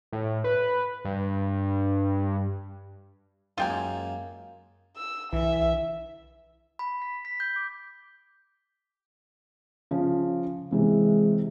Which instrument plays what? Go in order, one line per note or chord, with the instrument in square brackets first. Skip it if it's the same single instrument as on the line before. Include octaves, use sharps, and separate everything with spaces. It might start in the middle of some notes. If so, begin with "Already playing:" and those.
[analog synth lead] A2
B4
G2
[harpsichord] F#2 G#3 A#3 [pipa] F4 G5 G#5
[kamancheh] E6
[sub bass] B1 [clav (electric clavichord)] E3 [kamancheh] E5
[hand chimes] B5
B6
B6
G6
D6
[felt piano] C#3 F3
[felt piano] C3 E3 [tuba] G#3